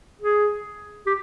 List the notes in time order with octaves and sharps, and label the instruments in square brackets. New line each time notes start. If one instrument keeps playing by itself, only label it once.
[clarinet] G#4
G4